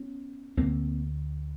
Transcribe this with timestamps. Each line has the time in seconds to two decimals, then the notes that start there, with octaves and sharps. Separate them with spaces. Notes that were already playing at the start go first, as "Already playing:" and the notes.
Already playing: B3 C#4
0.57 D2 D3 A#3 C4